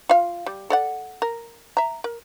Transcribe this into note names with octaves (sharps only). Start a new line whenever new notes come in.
F4 F5
G3
A4 D5 F#5
A#4
E5 A#5
A#4